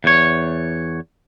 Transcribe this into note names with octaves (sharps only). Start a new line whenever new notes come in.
E2 C#5